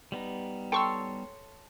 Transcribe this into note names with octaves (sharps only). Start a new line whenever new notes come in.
G3 B3 D#4
A4 C#5 G5 C6 C#6 E6